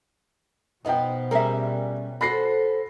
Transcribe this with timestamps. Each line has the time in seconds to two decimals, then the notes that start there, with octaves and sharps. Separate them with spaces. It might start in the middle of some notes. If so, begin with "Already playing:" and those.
0.85 B2 F3 B3 D#4 D#5 G5
1.31 G3 C#4 G#4 A#4 E5
2.21 F#4 A4 C5 B5 A#6 C7